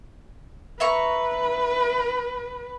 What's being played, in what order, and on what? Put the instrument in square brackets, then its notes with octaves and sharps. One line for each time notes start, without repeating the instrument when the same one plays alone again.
[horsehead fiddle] B4 [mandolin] E5 A#5 C#6